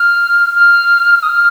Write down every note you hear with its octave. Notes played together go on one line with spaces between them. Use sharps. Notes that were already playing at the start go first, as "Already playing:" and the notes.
Already playing: F6
F6
D#6
F6